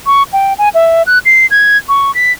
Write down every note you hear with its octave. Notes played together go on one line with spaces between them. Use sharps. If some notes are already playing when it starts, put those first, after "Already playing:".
C#6
G5
G#5
E5
F#6
C7
G#6
C#6
B6